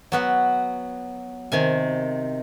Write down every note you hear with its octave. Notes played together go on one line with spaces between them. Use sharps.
F#3 B3 F#5
C3 D#3 G#5